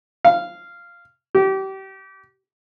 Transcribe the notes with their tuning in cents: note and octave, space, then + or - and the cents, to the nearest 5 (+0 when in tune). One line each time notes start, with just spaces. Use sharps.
F5 -10
G4 -30